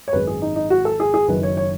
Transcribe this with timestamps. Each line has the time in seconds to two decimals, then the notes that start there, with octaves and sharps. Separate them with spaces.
0.08 C#5
0.13 G#1 F#2 D#3 G#3 B4
0.27 G#4
0.42 D#4
0.56 D#4
0.70 F#4
0.85 A4
1.00 G#4
1.14 G#4
1.28 F#1 F#2 D#3 B4
1.43 C#5
1.57 C#5